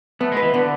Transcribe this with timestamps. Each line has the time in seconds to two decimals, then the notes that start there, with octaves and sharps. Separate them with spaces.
0.20 A3 B3
0.32 G#3
0.37 B4
0.43 E3
0.54 D3 B3